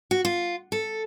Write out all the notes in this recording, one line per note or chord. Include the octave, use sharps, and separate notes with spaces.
F#4
F4
A4